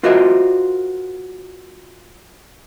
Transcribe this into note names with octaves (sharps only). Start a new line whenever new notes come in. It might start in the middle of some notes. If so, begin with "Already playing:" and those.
F4 F#4 A#4 C5 D#5 E5